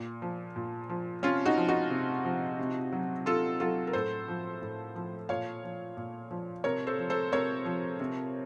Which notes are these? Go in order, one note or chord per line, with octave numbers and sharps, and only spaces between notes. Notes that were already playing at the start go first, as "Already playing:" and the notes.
Already playing: A#2
F3
A#2
F3
C3 C#4 F4
D#4 F#4
F3
D#4 F#4
C3
F3
C3
F#3
C3 F4 A4
F#3 F4 A4
A#4
A2 A4 C5
F3
A2
F3
A#2 C#5 F5
F3
A#2
F3
C3 A#4 C#5
A4 C5
F3
A4 C5
C3 A#4 C#5
F3
C3